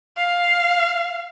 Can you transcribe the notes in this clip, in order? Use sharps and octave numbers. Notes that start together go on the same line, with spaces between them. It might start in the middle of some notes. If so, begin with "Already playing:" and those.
F5